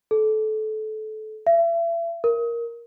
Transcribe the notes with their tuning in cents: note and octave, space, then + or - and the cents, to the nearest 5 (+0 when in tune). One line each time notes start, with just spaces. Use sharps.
A4 -25
E5 +35
A#4 +5